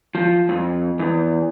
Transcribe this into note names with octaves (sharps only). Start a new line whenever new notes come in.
F3
F2
E2